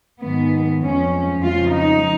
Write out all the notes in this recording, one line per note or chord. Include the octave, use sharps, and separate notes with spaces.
G#2 D#3 G#3 B3
F2 F3 G#3 C#4
F2 C#3 F3 G#3 F4
D#4